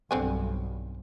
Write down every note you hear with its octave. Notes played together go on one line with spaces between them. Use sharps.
B1 G2 D3 C4 G#5